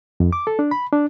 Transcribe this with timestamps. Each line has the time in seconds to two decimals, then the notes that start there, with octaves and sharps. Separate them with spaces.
0.20 F2
0.33 D6
0.47 A4
0.59 D4
0.71 B5
0.93 D4